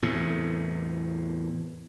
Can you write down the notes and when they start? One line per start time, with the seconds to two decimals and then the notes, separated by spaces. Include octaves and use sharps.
0.02 E2 A2 C3